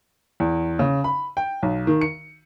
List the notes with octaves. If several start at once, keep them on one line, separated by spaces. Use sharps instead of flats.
E2
C#3
B5
G5
B1
D#3
C#7